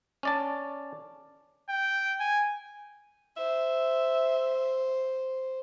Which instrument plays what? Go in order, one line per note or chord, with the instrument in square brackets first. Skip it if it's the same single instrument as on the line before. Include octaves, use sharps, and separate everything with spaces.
[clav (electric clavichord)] C#4 D5 A5
[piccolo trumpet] G5
G#5
[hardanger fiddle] C5 [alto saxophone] E5